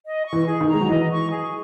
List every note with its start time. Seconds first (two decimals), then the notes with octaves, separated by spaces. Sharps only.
0.05 D#5
0.26 C#6
0.33 E3
0.47 G#4
0.61 D#3
0.68 A#5
0.74 G#3
0.81 F#3
0.89 E3 D#5
1.11 C#6
1.31 G#4